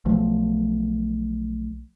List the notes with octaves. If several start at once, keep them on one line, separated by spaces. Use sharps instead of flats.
B1 F3 A3